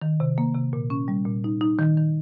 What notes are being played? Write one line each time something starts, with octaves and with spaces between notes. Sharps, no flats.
D#3
C3
A#3
C3
A#2
C#4
G3
A#2
D#4
D#4
D#3
D#3